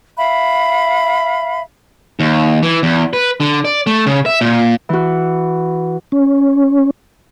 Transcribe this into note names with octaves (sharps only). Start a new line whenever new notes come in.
E5 F5 B5
D#2
E3
E2
B4
D3
D5
A3
C#3
E5
A#2
E3 F#4
C#4